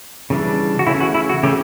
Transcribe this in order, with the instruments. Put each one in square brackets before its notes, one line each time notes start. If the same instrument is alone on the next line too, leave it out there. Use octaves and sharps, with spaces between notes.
[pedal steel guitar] C#3 E3 G3 D4
F#4
C#3 E3 A3 C#4 E4
F#4
E4
F#4
C#3 E3 A3 C#4 G4